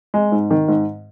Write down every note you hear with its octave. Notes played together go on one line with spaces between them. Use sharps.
G#3
G#2
D#3
G#2